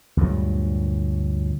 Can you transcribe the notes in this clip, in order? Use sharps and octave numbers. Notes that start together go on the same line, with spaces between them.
D2 G2 A#2 F#3